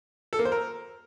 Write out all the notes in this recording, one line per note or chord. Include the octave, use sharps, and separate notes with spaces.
A4
A#3
C5
A#4